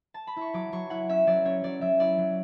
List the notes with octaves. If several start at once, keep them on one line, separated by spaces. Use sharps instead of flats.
A5
B5
E4 C#6
F#3 D6
F#3 C#6
E4 F#5
C#4 E5
F#3 D5
C#4 C#5
F#3 D5
F#3 E5
E4 D5
F#3